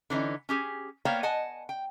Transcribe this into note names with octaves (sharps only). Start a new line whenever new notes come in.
D3 E3 C#4 D#4
C#4 G4 G#4
A#3 B3 C#5 D5 F5 G5
D#5 F#5 G#5 A5
G5